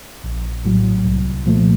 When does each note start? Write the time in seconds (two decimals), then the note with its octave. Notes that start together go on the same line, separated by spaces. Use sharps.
0.24 A#1
0.65 A2 F#3
1.05 C2
1.46 A#2 F3 A3